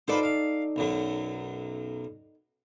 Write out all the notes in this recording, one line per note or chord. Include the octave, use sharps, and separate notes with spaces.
D#4 F4 A4 B4 C5 D5
F5
B1 F#2 F#3